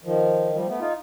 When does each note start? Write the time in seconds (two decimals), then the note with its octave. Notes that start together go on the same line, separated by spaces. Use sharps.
0.04 D#3 F3
0.53 F3 G3
0.67 A3 B3
0.80 D#4 F4